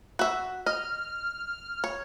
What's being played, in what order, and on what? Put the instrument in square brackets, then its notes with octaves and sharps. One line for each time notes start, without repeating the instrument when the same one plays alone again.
[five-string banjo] F#4 E5
[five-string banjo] D#5 [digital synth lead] F6
[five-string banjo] C#5